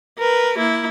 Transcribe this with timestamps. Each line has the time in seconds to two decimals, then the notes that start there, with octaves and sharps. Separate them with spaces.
0.18 A#4 B4
0.58 A#3 E4